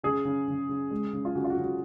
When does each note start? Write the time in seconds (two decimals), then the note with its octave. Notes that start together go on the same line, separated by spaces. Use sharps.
0.03 C#3 G#4
0.25 C#3
0.48 C#3
0.69 C#3
0.91 G#3
1.13 C#3
1.25 F4
1.35 C#3 F#4
1.44 F4
1.50 F#4
1.57 C#3
1.64 F#4